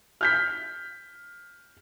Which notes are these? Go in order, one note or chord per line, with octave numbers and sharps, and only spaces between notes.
F6 G6 B6